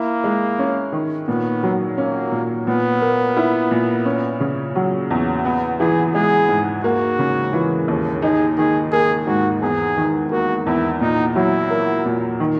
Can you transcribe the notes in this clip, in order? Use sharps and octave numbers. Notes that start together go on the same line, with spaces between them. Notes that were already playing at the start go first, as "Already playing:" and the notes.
Already playing: A#3 E4
G#3
C#4
D#3
A#2 B3
F#3
A#3 C#4
A#2
A#2 B3
A#3
E4
A#2
C#4
C#3
F#3
E2
B3
E3 G#4
G#3 G#4
G#2
A#3 F#4
C#3
E3
D#2
D#4 G#4
D#3 G#4
A#3 G#4
G#2 F#4
E2 G#4
D#3
A#3 F#4
E2 E4
A#2 D#4
F#3 E4
A#3
A#2
D#3